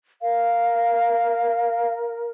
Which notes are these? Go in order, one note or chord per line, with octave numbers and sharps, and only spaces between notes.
A#4 F5